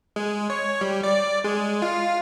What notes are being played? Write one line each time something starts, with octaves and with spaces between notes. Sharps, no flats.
G#3
C#5
G3
D5
G#3
F4